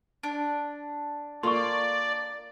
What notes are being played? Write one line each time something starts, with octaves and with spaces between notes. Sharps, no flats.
D4
A#3 F4 A4 D5 C6 C#6